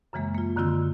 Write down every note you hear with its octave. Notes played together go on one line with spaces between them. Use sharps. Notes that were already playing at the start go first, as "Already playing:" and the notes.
F#2 C#3 E3 G#3 A#3
A#3 F4
F#2 D3 D#3 C4 F4 E6